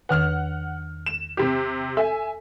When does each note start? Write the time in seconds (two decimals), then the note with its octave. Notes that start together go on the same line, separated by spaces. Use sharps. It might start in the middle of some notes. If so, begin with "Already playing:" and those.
0.09 E2 D#3 B4 F#5 F6
1.06 E7
1.37 C3 G4
1.97 A4 E5 G#5